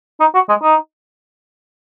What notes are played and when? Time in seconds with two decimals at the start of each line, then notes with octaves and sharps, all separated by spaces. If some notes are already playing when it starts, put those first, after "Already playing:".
0.20 D#4
0.34 F#4
0.49 G#3
0.62 D#4